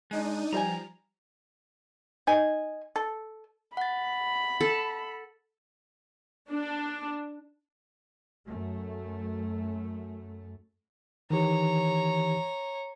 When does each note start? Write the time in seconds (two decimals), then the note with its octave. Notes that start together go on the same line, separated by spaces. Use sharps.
0.11 G#3 D4 D#4 D#7
0.53 B2 F3 G3 G4 D5 G5 G#5 A#5
2.27 D#4 G#5
2.96 A4
3.77 F#5 B5 A6
4.61 A4
6.51 D4
8.46 F#2 A3
11.30 D#3 E3 G4 C#5 A#5